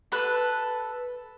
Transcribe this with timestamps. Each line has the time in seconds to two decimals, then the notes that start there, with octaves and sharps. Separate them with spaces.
0.12 A4 B4 F#6